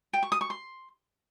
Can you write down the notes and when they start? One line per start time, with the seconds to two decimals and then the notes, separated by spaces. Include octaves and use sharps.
0.13 G5
0.23 C#6
0.32 D#6
0.41 C#6
0.50 C6